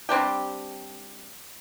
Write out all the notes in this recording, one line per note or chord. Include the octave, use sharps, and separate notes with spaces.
G3 C4 D4 G4